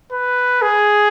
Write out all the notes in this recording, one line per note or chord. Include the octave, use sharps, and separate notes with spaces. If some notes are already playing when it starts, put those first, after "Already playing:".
B4
G#4